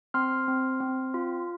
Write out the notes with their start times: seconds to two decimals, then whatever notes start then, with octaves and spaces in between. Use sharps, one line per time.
0.14 C4 C6 F6
0.48 C4
0.80 C4
1.14 F4